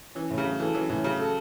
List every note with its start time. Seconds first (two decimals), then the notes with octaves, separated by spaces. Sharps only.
0.15 E3 C#4
0.30 A2
0.38 C#3
0.45 F#3
0.60 E3 A4
0.75 E3 C#4
0.89 A2 E3
1.04 C#3 F#3
1.19 A4